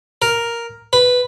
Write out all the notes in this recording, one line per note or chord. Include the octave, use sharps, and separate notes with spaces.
A#4
B4